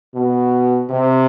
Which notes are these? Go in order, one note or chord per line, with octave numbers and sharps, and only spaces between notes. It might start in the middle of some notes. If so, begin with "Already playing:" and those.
B2
C3